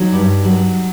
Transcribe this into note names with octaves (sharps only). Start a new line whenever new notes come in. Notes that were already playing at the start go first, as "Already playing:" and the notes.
Already playing: F#3 D#4
G2
F#3